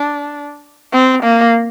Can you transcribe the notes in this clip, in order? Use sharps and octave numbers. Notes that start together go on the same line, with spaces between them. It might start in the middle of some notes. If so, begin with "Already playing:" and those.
Already playing: D4
C4
A#3